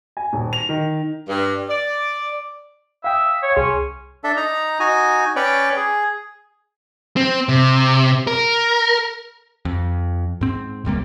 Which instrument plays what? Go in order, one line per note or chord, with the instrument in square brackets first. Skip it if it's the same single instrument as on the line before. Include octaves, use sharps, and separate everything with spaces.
[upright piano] G#5
D#1
F7
D#3
[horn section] G2
D5
[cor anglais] E5 [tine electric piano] F5 G5 D#6
[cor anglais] C#5
[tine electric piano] C2 G#4 C6 [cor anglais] C#4
[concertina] D4 A4 E5
D#4 A#5
D#4 F#4 G#5
C#4 B4 C#5 D5 G5
G#4
[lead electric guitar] C4
C3
A#4
[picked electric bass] F2
G#2 C4
E1 C#2 G3 A#3